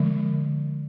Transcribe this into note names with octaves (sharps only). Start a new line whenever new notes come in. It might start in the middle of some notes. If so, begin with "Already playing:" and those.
Already playing: D3 F3 G#3